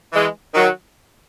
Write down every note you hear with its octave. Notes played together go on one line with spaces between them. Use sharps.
E3 G#3
D#3 F#3